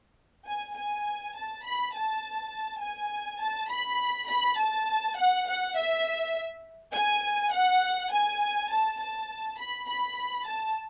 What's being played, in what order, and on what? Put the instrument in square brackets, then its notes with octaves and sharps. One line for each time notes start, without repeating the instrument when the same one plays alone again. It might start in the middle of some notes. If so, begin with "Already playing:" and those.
[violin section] G#5
G#5
A5
B5
A5
G#5
A5
B5
B5
A5
F#5
F#5
E5
G#5
F#5
G#5
A5
A5
B5
B5
A5